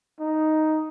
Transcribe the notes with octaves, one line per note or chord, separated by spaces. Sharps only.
D#4